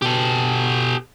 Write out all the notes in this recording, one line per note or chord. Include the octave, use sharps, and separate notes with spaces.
B2 G4 A4